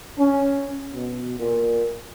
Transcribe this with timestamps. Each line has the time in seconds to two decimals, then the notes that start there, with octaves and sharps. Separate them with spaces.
0.18 C#4
0.93 B2
1.39 A#2